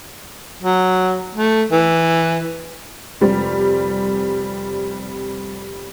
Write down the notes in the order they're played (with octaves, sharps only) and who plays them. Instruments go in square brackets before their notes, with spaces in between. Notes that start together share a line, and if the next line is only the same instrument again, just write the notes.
[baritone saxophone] F#3
A3
E3
[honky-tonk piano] F1 G3 C4